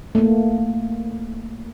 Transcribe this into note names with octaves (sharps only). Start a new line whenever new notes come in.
A3 A#3